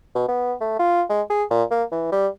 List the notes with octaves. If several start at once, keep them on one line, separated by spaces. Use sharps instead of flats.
B2
B3
A3
F4
G#3
G#4
A#2
A#3
E3
G3